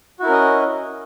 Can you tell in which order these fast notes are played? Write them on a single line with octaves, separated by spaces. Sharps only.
F#4 E4 A#4 C#4 D#5